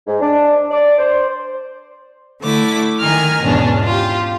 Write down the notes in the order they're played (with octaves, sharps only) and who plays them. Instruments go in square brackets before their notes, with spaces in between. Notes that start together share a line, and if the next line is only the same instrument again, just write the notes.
[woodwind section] G#2
D4
D5
C5
[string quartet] D3 A3 E4 D6
D#3 G#5 A#5 F6
E2 G#2 B2 C#4 D4
F4 G4